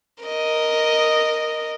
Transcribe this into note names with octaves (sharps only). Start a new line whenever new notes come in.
A#4 D#5